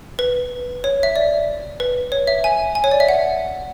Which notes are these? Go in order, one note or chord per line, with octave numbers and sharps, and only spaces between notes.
B4
C#5
E5
D5
B4
C#5
E5
G#5
G#5
C#5
D5
E5
F#5